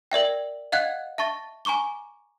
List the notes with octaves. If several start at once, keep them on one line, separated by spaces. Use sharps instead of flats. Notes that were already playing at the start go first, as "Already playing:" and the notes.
A#4 D5 E5 G5
D#5 F5 F#5 F#6 G#6
E5 A5 C#6 A6
G#5 A#5 C#6 D6 G7